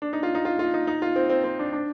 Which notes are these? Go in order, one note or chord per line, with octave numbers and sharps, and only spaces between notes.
D4
D#4
F4
D#4
F4
F4
D#4
D#4
F4
C4
C4
C4
D4
D4